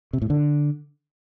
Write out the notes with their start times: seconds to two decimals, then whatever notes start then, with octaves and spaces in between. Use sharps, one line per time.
0.13 C3
0.22 A2
0.30 D3